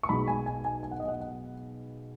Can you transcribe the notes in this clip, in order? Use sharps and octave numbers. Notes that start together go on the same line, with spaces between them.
C#6
B1 B2 G#3 B5
G#5
G#5
G#5
G#5
F#5
D#5
F#5
F#5